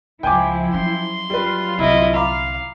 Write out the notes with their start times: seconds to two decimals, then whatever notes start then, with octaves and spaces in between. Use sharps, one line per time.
0.23 C#2 F3 E4 G5 G#5 D6
0.74 F#3 C#4 C6
1.30 F#2 G3 F4 B4
1.79 C2 D3 E4 D#5
2.14 F5 A#5 B5 D6